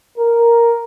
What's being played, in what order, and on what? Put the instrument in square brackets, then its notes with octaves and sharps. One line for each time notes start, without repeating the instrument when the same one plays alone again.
[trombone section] A#4